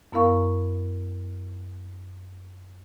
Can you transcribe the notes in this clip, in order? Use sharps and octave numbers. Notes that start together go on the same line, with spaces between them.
F#2 B3 E4 A#4 F5 C#6